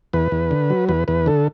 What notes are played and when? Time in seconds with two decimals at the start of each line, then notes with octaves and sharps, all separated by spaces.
0.13 E2 B4
0.32 E2
0.51 D3
0.70 F#3
0.89 E2 B4
1.08 E2 B4
1.26 D3 A4